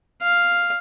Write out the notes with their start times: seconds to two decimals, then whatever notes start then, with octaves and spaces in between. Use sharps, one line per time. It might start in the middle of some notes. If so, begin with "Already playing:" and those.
0.22 F5